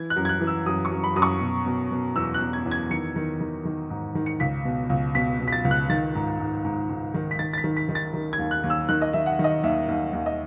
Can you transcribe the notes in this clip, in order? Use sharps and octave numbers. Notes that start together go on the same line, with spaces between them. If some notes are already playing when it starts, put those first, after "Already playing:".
Already playing: E3 G#6
F#6
F#2
G#6
F#6
E3
E6
F#2 D#6
C#6
F#2
B5
F#2 D#6
C#6
B2
B2
B2
E2 E6
F#6
E2
G#6
E2
G#6
D#3 C#7
D#3
D#3
D#3
G#2
D#3
C#7
C#2 B6
B2
C#2
B2 B6
B2
B6
A6
C#2
F#6
D#3 A6
G#2
G#2
G#2
G#2
D#3
B6
D#3 A6
A6
B6
D#3
B6
D#3
A6
D#3
G#6
D#2
F#6
D#2
E6
D#3 F#6
D#5
D#3 E5
F#5
D#3
D#5
D#2 E5
D#2
D#2
D#5